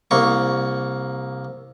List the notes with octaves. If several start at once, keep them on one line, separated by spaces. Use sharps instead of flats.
C2 A#3 C#6